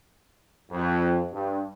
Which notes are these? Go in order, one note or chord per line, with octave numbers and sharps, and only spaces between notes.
F2
G2